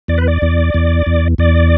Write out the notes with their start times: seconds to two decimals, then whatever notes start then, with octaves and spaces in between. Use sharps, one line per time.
0.08 E2 D5
0.18 B4
0.28 D5
0.42 E2
0.74 E2
1.06 E2
1.38 E2 D5